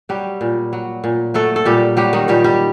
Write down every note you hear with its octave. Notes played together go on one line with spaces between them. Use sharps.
F#3 G3 G4
A#2
F#3
A#2
F#3 A3 A4
A4
A#2 G3 G4
F#3 G3 G4
D#3 D#4
A#2 G3 G4
G3 G4